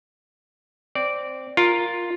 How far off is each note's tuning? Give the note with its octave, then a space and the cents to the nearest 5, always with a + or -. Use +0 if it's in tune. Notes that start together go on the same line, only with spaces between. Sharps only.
C4 +0 D5 -10
F4 +0 A#4 +0